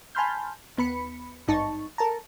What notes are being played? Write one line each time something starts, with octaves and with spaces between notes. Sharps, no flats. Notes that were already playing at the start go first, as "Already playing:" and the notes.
G#5 A5 B5 C6 F6 G6
D#2 B3 B5 C#7
G#1 G2 D#4 A5 C#6
A4 A#4 A5 A#5